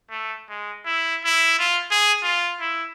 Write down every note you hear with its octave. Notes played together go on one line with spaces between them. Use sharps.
A3
G#3
E4
E4
F4
G#4
F4
E4